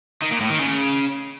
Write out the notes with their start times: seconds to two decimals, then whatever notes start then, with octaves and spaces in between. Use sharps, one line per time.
0.22 D#3
0.31 A#2
0.40 A2
0.50 D#3
0.59 C#3